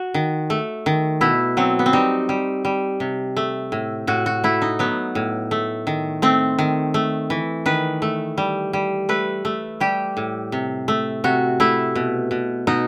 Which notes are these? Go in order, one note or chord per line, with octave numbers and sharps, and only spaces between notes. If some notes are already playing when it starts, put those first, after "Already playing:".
Already playing: F#4
D#3
A3
D#3
B2 E4
F#3 C4
B3
C4
G3 D#4
G3
G3
C3
A3
A2
A2 F#4
F#4
A3 E4
D#4
F#3 B3
A2
A3
D#3
A3 C4
D#3
A3
E3
D#3 B4
A3
G3
G3
A3 B4
A3
G3 G4
A2
C3
A3
C3 F#4
A3 E4
B2
B2
B2 D#4